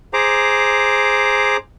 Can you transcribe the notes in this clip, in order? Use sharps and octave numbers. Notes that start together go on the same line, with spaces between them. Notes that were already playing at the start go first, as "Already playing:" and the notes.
G#4 C5 A#5 D6